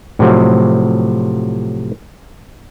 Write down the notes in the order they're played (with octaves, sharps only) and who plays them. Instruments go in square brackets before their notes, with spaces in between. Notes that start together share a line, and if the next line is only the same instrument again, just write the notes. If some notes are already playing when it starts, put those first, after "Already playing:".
[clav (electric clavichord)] A2 C3 F3 F#3